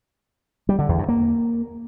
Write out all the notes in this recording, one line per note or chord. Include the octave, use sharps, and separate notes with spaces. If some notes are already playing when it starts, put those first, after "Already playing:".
G3
D3
E2
G2
A#3